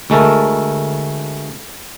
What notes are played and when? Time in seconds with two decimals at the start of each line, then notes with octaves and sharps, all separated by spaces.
0.10 D2 G#3 A3 A4 A#4